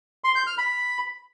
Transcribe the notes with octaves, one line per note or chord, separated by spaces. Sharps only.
C6
G6
F6
B5